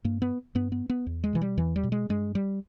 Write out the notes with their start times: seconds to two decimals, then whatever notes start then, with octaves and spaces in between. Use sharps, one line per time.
0.04 G2 A#3
0.22 B3
0.55 G2 B3
0.72 B3
0.89 B3
1.07 E2
1.24 G#3
1.33 B2 E3
1.42 G3
1.57 E2 E3
1.76 G3
1.83 B2
1.92 G#3
2.09 G2 G#3
2.35 G3